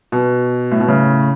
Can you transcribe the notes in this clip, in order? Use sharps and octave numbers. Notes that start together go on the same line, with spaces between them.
B2
A2
B2
A2 C#3